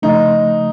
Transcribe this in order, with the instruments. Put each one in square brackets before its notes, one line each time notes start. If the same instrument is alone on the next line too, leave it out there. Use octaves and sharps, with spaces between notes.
[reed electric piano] C#3 F3 A3 [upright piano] D#4